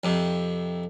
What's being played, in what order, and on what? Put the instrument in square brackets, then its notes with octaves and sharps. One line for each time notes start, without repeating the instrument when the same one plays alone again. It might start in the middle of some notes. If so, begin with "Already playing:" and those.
[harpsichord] F2 C3